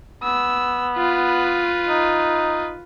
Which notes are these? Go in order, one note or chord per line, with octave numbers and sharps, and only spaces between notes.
B3 E6
F4 B4
D#4